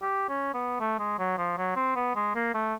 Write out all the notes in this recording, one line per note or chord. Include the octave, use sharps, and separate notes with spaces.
G4
C#4
B3
A3
G#3
F#3
F3
F#3
C4
B3
G#3
A#3
A3